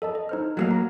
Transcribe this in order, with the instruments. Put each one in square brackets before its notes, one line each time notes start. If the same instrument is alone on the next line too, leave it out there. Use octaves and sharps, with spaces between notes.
[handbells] A4 D#5 A5
D#5
D#4 C5 F6
[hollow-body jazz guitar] F#3 A3 A#3
[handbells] A#5